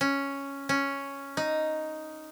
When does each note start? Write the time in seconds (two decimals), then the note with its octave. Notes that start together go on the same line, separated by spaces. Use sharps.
0.01 C#4
0.69 C#4
1.37 D#4